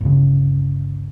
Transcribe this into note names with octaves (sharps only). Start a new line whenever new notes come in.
G1 C#2 C#3